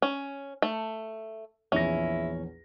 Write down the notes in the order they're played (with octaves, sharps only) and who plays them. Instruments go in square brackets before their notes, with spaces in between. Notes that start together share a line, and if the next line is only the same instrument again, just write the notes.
[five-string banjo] C#4
A3
[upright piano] A#1 E2 A#6 [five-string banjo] C#4 [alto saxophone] E4